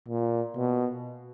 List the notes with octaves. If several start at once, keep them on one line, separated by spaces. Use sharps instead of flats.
A#2
B2